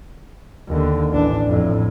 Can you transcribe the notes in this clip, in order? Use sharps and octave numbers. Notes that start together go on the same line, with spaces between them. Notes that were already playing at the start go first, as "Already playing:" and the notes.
D#2 D3
A1 D4
F2 A2